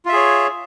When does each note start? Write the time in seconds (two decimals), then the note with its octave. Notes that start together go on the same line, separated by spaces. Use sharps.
0.05 F4
0.09 E5
0.12 G#4
0.16 C#5